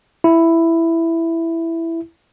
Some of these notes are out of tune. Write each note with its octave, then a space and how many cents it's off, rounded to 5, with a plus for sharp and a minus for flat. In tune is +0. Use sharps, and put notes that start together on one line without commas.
E4 +5